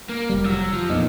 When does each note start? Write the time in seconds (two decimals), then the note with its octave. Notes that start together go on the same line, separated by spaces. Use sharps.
0.09 A#3
0.29 F1 G3
0.45 F3 F#3 E6
0.73 F3
0.90 F2 A#2 B3 C4 D#4